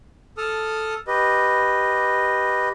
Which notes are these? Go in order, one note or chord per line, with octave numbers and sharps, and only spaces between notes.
A4 A5 D#6 F6
G4 B4 D#5